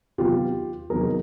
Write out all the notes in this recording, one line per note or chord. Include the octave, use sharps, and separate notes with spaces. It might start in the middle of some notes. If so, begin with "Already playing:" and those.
C3 D#3 F#3 B3 F4 G4
C3 D#3 F#3 B3 G#4 A#4